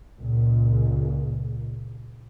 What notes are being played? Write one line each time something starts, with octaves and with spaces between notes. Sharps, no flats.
C#2 A#2